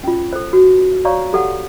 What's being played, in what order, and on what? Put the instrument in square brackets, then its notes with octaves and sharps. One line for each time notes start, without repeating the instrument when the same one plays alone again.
[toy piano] C#4 F4
A4 C5
F#4
C#5 D5 F5 A#5 C#6
G4 A4 F#5